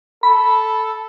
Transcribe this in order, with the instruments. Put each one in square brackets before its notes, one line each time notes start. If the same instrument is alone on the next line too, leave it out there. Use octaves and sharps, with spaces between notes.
[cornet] A4 [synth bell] B5